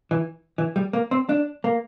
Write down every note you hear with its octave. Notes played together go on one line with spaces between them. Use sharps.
E3
E3
G3
A#3
C4
D4
A#3